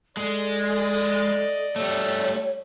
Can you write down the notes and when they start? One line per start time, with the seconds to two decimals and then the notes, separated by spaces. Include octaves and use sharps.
0.17 G#3 A4 D5 D#5
1.76 G3 A3 C#5